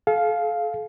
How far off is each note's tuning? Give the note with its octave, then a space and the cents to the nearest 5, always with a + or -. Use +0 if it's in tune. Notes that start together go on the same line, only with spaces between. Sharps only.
A4 -40 F5 +0